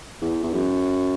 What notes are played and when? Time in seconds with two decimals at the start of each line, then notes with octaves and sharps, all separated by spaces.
0.22 E2
0.43 E2
0.54 F#2